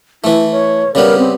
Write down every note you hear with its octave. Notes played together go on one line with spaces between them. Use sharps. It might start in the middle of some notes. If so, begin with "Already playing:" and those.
E3 A3 E4
C#5
C#3 G3 B3 A#4
C4